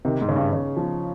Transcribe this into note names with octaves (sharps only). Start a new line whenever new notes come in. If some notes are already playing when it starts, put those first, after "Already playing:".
C3 D#3 D#4
G#2
C#3
G2
C#3
F3